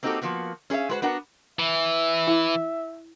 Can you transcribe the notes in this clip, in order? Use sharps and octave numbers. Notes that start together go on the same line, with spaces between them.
A#3 C4 D#4 F#4 G4 A4
F3 A#3 B3 F#4
C#4 G#4 C5 E5 F5
G#3 F#4 B4 C5 F#5
B3 D4 F#4 A#4 F#5
E3 E5
E4